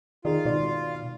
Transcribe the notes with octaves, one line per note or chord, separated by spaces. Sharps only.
D#3 D#4 F4 G#4 D5
G#1 B2 D5